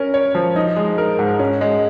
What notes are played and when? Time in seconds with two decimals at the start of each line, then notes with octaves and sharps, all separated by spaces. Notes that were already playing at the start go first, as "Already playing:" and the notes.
Already playing: C#4 A#4
0.14 C#5
0.35 F3
0.56 D#4
0.76 G#3
0.98 A#4
1.19 G#2
1.39 C#4
1.61 G#3